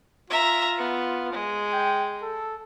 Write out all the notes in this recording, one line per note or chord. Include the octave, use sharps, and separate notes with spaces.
F4 E5 A#5
B3
G#3
G5
A4